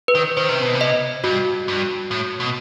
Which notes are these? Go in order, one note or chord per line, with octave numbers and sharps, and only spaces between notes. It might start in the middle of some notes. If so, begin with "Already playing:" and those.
B4
D#3
D#3 C5
C3
B2
C3
D#5
G2 F#4
G2
A2
B2